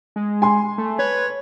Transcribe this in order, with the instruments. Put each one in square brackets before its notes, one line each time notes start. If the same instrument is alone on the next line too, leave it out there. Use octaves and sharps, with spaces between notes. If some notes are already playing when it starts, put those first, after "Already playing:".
[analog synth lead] G#3
[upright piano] G#5 C6
[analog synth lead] A3
[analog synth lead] B4 [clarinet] C#5